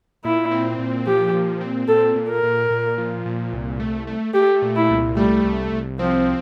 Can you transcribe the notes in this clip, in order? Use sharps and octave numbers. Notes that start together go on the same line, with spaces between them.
A#2 E4
C4
A#2
F3 G4
A#2
C4
A#2 A4
A#2
A#4
A#2
A#2
F3
A#2
C2
A3
A3
A3 G4
A#2
E4
C2
G3 A3
C2
C2
F3 C4